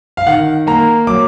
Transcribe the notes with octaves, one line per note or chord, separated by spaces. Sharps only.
F5
D#3 F#5
A#3 A#5
F#3 D6